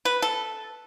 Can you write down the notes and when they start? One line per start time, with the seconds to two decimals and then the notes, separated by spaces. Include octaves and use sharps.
0.05 B4
0.22 A4